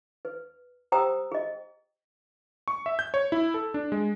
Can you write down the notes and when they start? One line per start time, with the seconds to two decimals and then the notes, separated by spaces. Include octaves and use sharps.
0.25 B4
0.92 G4 C5 G5 A#5 D#6 E6
1.32 G#4 D#5
2.68 C#6
2.86 E5
2.99 G6
3.14 C#5
3.32 E4
3.54 A4
3.74 D4
3.92 G#3